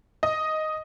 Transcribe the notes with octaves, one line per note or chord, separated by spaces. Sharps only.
D#5